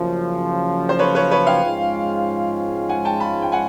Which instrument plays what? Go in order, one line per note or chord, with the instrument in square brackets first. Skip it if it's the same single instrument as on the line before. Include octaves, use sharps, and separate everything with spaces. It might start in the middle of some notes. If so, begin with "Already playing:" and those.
Already playing: [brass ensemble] F#1 F#2 C#3 F3
[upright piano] C5
B4 C#5
B4 C#5
B4 C#5
F5 G5
[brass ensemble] G#2 F3 G#3 C#4 F4
[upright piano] F#5 G#5
G5 A5
A5 B5
G5
F#5 G#5